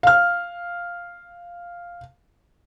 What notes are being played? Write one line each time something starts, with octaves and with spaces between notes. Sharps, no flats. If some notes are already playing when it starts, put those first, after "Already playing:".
F5 F6